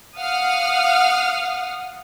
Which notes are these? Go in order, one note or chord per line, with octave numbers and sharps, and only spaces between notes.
F5 F#5 D#6 F6